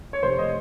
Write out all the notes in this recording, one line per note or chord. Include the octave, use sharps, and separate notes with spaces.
C#5
F1 C5
D#5